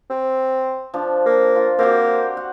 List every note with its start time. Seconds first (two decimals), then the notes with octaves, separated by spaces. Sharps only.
0.10 C4
0.94 F3 D4
1.26 A#3
1.56 F4
1.79 A#3 C4 F#4 G4
2.37 F#5